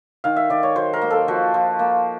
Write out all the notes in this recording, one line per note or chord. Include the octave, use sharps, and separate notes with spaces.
D#3 F5
E5
D#3 D5
C#5
F#3 C5
A#4
A#3
A4
F3 F#4
F3
A#3